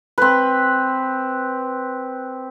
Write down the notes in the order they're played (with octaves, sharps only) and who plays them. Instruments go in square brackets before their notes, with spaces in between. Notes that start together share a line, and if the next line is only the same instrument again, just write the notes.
[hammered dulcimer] C4 B4